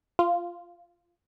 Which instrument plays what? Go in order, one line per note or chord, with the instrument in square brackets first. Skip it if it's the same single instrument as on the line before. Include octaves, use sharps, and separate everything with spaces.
[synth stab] F4